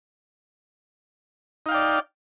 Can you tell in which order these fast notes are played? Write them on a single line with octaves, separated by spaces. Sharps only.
D#4 F5 G5 D5